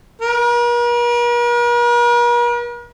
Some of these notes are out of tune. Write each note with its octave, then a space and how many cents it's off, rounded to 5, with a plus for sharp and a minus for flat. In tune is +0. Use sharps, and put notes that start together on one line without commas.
A#4 +45